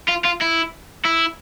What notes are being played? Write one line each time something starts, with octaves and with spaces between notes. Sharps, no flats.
F4
F4
E4
E4